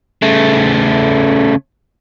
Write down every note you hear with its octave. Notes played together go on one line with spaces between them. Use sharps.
C#3 A3